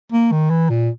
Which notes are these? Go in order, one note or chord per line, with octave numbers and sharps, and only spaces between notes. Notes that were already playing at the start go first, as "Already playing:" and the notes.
A#3
D#3
E3
A#2